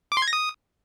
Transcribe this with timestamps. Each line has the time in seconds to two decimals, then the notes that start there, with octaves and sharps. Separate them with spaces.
0.12 D6
0.17 C6
0.22 G#6
0.28 A#6
0.33 D#6